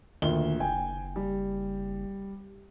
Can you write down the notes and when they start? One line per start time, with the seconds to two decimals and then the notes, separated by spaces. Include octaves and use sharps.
0.22 D2 A#2 D#3 G7
0.60 F#1 G5 G#5
1.16 G3